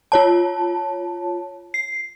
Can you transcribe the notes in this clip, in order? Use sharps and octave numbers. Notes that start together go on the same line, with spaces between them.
F4 C#5 A5
C7